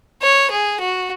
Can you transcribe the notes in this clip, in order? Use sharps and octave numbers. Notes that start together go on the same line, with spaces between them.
C#5
G#4
F#4